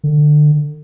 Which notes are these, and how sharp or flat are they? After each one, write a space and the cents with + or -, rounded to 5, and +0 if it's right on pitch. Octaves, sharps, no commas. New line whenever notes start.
D3 +25